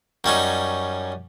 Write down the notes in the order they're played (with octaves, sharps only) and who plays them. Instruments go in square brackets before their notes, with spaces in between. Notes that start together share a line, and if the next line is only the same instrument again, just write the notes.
[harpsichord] F#2 G3 C#4 D#4